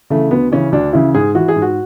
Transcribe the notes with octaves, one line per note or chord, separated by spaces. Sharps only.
C#3 E3 A3
D2 B3
C#3 E3 C#4
D2 D4
C#3 E3 E4
G#2 G#4
E3 F#4
G#4
G#2
F#4